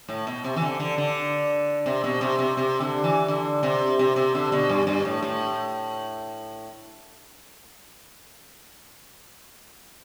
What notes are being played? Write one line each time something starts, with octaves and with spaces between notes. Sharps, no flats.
A2
B2
C3
E3
D3
D3
D3
C3
B2
C3
C3
C3
D3
E3
D3
C3
C3
C3
D3
B2
G2
G2
A2
A2